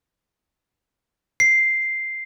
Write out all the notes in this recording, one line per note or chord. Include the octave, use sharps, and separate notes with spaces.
C7